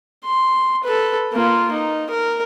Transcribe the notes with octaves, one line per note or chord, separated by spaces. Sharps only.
C6
A4 B4
A#3 F4
D#4
A#4